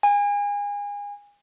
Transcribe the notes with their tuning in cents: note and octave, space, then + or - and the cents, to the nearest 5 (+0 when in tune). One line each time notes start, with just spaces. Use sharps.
G#5 -30